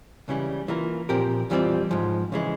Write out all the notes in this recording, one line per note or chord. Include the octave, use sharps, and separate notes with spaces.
C#2 C#3 E3 G3 C#4
E3 A#3 F4 A#4
A#2 F3 C4 G4 A#4
F2 E3 G3 C4 F4
G#2 F3 G#3
C#3 E3 G#3